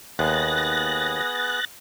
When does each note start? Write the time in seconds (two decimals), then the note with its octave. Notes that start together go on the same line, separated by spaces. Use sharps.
0.19 D#2 B3 G#4 F#6 A6 A#6